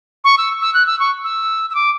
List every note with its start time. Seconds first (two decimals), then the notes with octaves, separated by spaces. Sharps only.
0.24 C#6
0.38 E6
0.62 E6
0.74 F#6
0.87 E6
1.00 C#6
1.24 E6
1.70 E6
1.75 D6